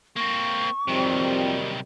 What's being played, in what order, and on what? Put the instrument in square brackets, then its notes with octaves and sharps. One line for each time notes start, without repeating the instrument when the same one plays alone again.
[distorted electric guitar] A#3 C4 [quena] C#6
[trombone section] F2 C4 [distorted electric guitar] C3 F#3 [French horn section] D#3 G3